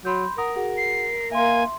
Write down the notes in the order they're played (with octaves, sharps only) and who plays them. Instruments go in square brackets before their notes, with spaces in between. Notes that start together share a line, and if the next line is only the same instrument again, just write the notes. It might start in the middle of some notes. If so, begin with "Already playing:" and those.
[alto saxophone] F#3 [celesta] B5 C6 G6
[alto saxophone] A#4 [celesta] F#5 A#5 D#6
[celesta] F#4 G#4 F#5
[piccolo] C7
[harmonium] A#3 [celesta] E5 C6 [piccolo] G#5